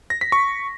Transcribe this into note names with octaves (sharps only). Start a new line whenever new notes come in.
A#6
B6
C#6